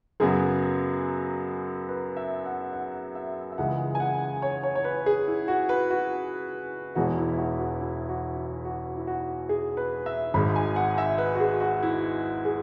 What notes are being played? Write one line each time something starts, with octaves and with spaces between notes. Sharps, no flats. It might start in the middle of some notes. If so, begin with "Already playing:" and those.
F#2 C#3 F#3 B3 G#4
B4
E5
F#5
F#5
E5
E5
C#2 C#3 E3 G#3 F#5
G#5
F#5
C#5
C#5
C#5
B4
G#4
E4
F#4
B4
F#4
E1 E2 E3 G#3 F#4
E4
F#4
F#4
E4
F#4
E4
F#4
E4
F#4
G#4
B4
E5
G#1 G#2 G#3 B5
G#5
F#5
E5
B4
F#4
G#4
F#4
E4
G#4